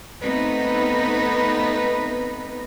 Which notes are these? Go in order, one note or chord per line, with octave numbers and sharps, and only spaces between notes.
A3 B3 C4 D#4 B4